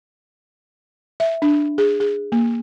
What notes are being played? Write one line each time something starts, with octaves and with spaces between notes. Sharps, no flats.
E5
D4
G#4
G#4
A#3